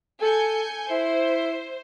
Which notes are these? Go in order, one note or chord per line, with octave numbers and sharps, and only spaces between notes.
A4 G#5 G6 C#7
E4 C5